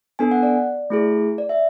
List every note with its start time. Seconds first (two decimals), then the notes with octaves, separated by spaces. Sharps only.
0.19 B3 D4 A4 G#5
0.31 F#5
0.43 D5
0.90 A3 E4 G#4
1.38 D5
1.49 E5